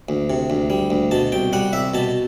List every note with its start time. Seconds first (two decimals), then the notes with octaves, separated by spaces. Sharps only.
0.09 D2
0.30 C3
0.50 D2
0.70 G3
0.90 D2
1.11 B2 A5
1.32 C2 G5
1.53 G3 F#5
1.73 C2 E5
1.94 B2 A5